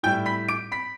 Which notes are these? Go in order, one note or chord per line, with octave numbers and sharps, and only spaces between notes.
A2 G3 E4 G5 G6
B5 B6
D6 D7
B5 B6